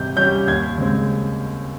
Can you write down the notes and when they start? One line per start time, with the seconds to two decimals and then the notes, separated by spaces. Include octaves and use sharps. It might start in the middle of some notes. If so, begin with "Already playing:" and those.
Already playing: C3 G3 G6
0.16 G3 C#4 G6
0.47 D#2 G#6
0.78 C#3 G#3 C4